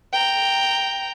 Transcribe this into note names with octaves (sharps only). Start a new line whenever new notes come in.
G5 A#5